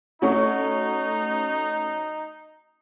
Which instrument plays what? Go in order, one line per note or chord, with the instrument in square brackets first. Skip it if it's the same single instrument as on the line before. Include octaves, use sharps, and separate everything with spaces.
[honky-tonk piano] A3 C#4 F#4 [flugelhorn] D#4